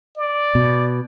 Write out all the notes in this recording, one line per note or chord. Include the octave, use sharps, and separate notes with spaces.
D5
B2